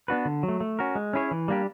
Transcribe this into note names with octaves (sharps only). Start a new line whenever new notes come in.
B3 D4 F#4 B4
D3
F#3
A3
A3
C#4 F#4 A#4
G#3
C#4 E4 G#4 C#5
E3
G3 A#3 D4 G4